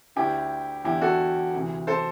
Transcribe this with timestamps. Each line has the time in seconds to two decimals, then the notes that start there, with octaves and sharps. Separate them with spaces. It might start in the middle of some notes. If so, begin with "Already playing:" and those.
0.16 D2 D3 E4 G4
0.85 E2 D3 E4 G4
1.02 F#4 A4
1.54 D2 C3 E3
1.87 A4 C5